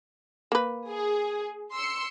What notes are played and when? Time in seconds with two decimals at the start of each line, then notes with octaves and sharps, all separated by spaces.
0.52 A#3 B4
0.88 G#4
1.74 C6 E6 C#7